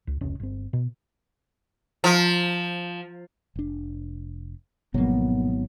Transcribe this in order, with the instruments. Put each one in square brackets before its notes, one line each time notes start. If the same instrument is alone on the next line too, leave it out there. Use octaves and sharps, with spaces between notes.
[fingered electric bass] C#2
F1 C#2 C#4
G1 C4
B2
[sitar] F3
[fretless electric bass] F1 D4
[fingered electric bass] G#1 F#3 [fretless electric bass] B2 F3 A#3 [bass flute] B3